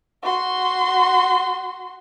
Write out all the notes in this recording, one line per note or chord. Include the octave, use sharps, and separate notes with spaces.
F#4 C6